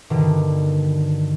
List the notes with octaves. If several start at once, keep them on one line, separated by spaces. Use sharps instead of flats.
G2 B2 D3 D#3